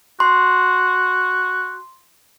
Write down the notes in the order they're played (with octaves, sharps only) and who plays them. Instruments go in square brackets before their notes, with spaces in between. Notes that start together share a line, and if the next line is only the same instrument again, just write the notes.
[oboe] F#4 [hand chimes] C6